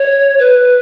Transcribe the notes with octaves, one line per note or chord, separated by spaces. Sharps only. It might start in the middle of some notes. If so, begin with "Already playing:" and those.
Already playing: C#5
B4